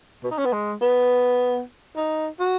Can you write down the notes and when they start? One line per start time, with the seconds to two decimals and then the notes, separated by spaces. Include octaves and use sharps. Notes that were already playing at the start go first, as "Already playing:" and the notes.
0.23 B2
0.31 D#4
0.38 C#4
0.45 B3
0.53 G#3
0.81 B3
1.97 D#4
2.40 F#4